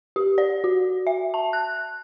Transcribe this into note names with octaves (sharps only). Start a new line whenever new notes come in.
G4
D5
F#4
E5
A5
F#6